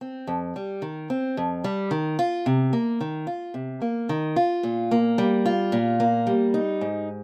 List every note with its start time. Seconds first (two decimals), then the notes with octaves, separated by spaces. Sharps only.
0.01 C4
0.27 F2
0.56 G3
0.82 D#3
1.10 C4
1.37 F2
1.64 G3
1.91 D#3
2.19 F4
2.46 C3
2.73 A#3
3.01 D#3
3.27 F4
3.54 C3
3.82 A#3
4.09 D#3
4.36 F4
4.63 A#2
4.91 A#3
5.18 G3
5.46 F4
5.72 A#2
6.00 A#3
6.27 G3
6.54 D#4
6.81 G#2